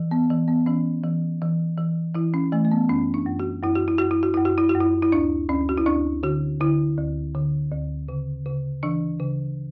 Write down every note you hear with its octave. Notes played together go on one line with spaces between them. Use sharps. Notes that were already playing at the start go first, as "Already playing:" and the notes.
Already playing: E3
B3
E3
B3
E3 C#4
E3
E3
E3
E3 E4
C#4
E3 A3
A3
B3
F#2 C#4
D4
F#2
F#4
F#2 E4
F#4
E4
F#2 F#4
E4
F#4
F#2 E4
F#4
E4
F#4
F#2
E4
E4
D2 D4
D2 C#4
F#4
E4
D2 D4
D3 F#4
D3 E4
D2
D3
D2
C#3
C#3
E3 D4
C#3